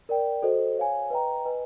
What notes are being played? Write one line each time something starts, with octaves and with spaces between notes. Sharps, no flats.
A#4 D5 G5
F#4 A4 C5 D#5
C#5 F5 G#5
B4 D#5 G5 A#5
B4 D#5 G#5